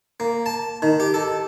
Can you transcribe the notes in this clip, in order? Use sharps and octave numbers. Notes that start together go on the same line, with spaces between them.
A#3
A5
D#3
G4
A4